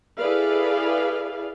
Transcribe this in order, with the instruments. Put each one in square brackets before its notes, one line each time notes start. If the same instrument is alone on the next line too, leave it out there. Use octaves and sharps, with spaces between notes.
[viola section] E4 G#4 A4 B4 D5 F5